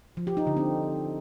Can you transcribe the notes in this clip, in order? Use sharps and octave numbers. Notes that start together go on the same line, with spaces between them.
F3
G4
D#4
D3
C4